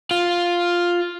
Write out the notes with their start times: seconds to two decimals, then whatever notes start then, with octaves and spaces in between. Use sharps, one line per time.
0.11 F4